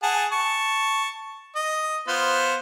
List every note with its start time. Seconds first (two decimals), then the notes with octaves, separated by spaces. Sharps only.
0.03 G#4 F#5 A5
0.32 A5 C#6
1.56 D#5
2.08 B3 F4 C5